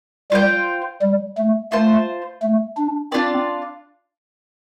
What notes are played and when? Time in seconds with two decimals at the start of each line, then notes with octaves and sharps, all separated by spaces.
0.32 G3 F4 C5 G5
1.02 G3
1.38 A3
1.72 A3 F4 C5 A5
2.42 A3
2.77 D4
3.12 C4 D4 F4 D5